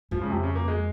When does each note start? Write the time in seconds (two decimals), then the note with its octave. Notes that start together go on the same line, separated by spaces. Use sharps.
0.11 G#2 F3
0.21 C#3
0.30 F2 C3
0.43 C#3
0.55 A#3
0.68 G#3